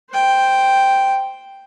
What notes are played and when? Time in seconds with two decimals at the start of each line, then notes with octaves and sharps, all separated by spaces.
0.11 C5 G5